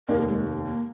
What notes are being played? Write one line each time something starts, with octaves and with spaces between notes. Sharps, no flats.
F1 D#2 D#3 A#4
A#3
G#3
A#3
A#3